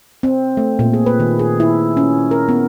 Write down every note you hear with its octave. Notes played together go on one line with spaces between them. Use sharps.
C4
A3
A#2
G#4
B4
D#3
G#4
E4
C#4
A#4
B3